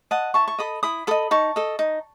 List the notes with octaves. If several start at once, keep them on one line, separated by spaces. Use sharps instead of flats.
D#5 F#5 A5
E4 A5 C#6
C#6
A4 D#5 B5 D#6
E4 B5 D#6
A4 D#5 B5 D#6
D#4 A5 C#6
A4 D#5
D#4